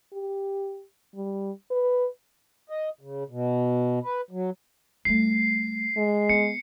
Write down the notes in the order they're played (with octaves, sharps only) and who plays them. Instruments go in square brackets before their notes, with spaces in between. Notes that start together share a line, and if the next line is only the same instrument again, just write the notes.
[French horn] G4
G3
B4
[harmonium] D#5
C#3
B2
B4
F#3
[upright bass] G3 A3 [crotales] C7
[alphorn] G#3
[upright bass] B3 [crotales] C#7